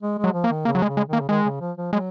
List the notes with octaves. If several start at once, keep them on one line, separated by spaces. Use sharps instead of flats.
G#3
G#3
F#3
F3
A#3
D#3
C#3 A#3
F#3
G#3
C#3
G#3
D#3 A#3
C#3
D#3 G#3
C#3
F3
F3
F#3 G#3